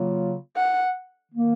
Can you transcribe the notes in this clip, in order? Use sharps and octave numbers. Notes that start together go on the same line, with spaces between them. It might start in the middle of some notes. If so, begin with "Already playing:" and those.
Already playing: C#3 F#3 A#3 F4
F#5
D#3 A#3